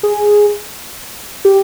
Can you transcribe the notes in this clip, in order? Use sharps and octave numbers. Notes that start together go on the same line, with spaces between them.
G#4
G4